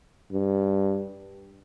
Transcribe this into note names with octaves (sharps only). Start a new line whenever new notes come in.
G2